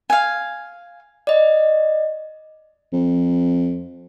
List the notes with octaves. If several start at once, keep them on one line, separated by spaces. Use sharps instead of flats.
F5 G#5
D5 D#5
F2